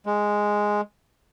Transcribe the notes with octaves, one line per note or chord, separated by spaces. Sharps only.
G#3